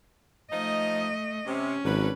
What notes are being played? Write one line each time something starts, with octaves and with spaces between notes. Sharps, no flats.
F3 A3 D#4 D#5
C3 C#4
G#1 F#3 D4 B4